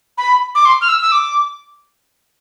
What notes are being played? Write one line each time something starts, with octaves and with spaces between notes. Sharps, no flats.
B5
D6
C6
F6
E6
E6
D6